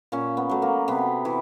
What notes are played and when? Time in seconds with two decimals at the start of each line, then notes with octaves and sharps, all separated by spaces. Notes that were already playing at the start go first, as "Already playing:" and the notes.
0.12 A#2 C#4
0.37 B3
0.50 F#3 A3
0.62 A#3
0.88 C3 B3
1.25 E3